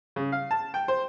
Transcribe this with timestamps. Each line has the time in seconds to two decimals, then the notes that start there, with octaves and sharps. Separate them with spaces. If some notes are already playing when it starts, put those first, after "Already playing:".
0.16 C#3
0.32 F5
0.51 A5
0.74 G5
0.88 C5